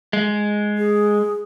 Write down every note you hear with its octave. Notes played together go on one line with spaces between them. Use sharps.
G#3
G#4